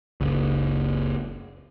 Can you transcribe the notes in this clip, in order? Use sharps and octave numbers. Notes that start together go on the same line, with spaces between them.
F#1 C#2